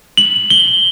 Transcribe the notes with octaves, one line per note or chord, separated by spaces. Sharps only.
F#7
G7